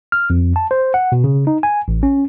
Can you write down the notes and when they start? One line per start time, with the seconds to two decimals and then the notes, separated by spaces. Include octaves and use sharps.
0.12 F6
0.30 F2
0.56 A5
0.71 C5
0.94 F#5
1.12 B2
1.24 C#3
1.47 D#4
1.63 G#5
1.88 A1
2.03 C#4